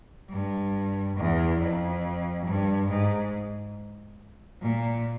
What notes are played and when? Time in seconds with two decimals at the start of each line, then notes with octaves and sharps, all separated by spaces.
0.29 G2
1.16 E2
1.59 F2
2.45 G2
2.88 G#2
4.61 A#2